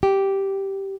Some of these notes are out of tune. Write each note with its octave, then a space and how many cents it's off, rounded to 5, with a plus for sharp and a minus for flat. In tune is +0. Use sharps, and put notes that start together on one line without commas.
G4 -5